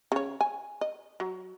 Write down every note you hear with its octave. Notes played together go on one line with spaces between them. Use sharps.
C#3 C#5
G#5
D#5
F#3